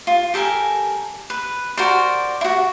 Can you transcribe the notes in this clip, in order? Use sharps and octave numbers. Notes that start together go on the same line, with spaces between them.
F4
G4 A4 A#4 G#5
B4
F#4 A#4 C5 D5
E4 F#4